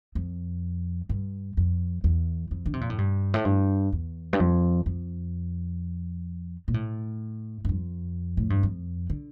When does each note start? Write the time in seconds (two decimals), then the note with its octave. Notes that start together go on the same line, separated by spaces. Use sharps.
0.15 F2
1.09 G2
1.57 F2
2.04 E2
2.51 F2
2.66 D3
2.74 C3
2.81 A#2
2.90 A2
2.98 G2
3.34 A2
3.45 G2
3.92 E2
4.33 G2
4.40 F2
4.86 F2
6.68 A#2
6.74 A2
7.65 G2
7.69 F2
8.37 A2
8.50 G2
8.63 F2
9.10 D3